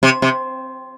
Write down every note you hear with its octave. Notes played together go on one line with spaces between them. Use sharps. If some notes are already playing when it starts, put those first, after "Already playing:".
C3
C3